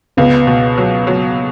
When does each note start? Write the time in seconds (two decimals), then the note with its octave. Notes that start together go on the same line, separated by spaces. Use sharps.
0.17 C#2 B3
0.47 B2
0.78 F#3
1.07 F#3